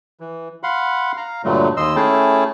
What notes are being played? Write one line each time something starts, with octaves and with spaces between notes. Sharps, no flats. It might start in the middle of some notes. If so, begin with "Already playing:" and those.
E3
F5 F#5 B5 C6
F5 A#5
G2 A#2 D3 F#3 A3
D#2 D#5 C6 E6
A3 C#4 E4 G#4 G5 A5